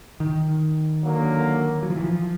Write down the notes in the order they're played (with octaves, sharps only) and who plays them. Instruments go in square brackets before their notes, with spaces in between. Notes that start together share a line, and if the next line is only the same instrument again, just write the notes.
[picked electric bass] D#3
[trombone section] D3 F#3 A#3
[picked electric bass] F#3
F3
E3
F3